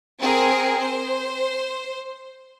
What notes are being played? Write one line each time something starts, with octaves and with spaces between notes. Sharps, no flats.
C4 G#4 A#4
C5